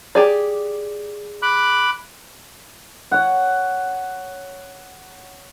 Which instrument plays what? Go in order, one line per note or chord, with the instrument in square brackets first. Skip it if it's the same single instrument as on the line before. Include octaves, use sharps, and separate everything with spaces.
[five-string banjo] G4 G#4 D5
[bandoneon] B5 D6 F#6
[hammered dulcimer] C#5 F#5